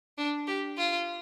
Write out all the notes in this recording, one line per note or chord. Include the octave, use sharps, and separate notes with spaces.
D4
G4
F4